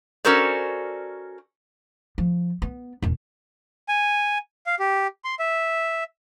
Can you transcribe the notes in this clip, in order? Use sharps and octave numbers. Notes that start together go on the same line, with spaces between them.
C#4 F#4 A4 A#4 C5 D5
F3
B3
E1 C#4
G#5
F5
G4
C6
E5